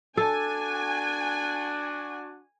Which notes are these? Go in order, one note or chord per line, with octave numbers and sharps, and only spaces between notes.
D4 F#4 A4 G#5